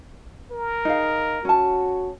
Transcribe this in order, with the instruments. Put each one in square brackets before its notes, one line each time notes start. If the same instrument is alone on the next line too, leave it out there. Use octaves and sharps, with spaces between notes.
[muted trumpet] A#4
[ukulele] D#4 G#4 F5
[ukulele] C#4 A5 [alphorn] F#4